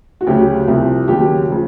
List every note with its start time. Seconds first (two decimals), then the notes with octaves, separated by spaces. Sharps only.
0.21 F#4
0.27 D2 C#3 F#3 G4
0.68 C2 C3 F3
1.08 D#2 C#3 F#3 G4
1.51 C#3 F3